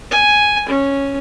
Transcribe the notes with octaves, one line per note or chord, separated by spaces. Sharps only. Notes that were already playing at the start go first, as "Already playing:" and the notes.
G#5
C#4